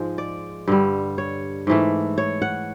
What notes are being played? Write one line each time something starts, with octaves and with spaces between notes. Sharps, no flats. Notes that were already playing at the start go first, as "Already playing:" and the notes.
Already playing: G#2 F3 G#3
D5
G2 D3 G3
C#5
G#2 E3 A3
C#5
F#5